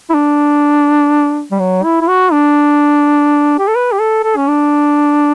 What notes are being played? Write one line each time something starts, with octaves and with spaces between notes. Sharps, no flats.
E4
D4
G3
F#3
E4
E4
F#4
D4
G4
A4
B4
G4
A4
A4
C#4
D4